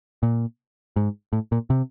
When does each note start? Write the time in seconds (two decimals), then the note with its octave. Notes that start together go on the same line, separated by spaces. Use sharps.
0.23 A#2
0.96 G#2
1.33 A2
1.52 A#2
1.70 C3